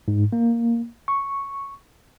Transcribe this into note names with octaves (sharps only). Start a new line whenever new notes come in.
G#2
A#3
C#6